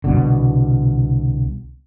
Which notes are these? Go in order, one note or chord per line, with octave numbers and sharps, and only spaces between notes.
C2 B2 D3